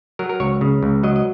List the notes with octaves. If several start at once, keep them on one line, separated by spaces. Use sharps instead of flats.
F#3 A#4
A#4
C#2 C#5
C#3
C#2
F#3 D#5
D#5